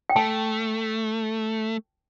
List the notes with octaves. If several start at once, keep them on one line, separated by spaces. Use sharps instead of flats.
G5
A3 A5